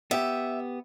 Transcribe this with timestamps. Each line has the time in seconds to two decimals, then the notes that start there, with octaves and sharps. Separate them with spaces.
0.11 B3 G4 E5